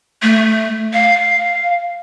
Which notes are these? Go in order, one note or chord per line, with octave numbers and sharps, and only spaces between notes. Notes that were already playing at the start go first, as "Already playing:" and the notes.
A3
F5